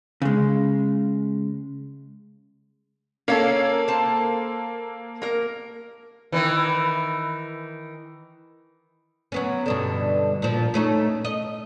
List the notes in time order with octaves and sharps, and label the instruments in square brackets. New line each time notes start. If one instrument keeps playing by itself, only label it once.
[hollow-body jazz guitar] C#3 G#3
[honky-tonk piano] A#3 A4 [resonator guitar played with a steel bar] C#4 C#5 F5
[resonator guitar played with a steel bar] C5 A5
A#3 A#4
[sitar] D#3 E3
[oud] F#3 B3 C#4
G2 B2 D3
A#2 F3
A3 C#4 D#4
D#5